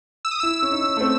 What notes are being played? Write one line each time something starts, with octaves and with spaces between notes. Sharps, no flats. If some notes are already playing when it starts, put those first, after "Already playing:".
E6
D#6
E4 E6
C#4
D#4
C#4
A3
C4